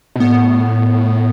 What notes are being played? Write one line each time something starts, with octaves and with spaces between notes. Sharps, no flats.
B2
A2 B3